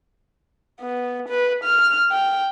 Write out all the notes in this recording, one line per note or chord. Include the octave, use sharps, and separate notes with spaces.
B3
B4
F6
G5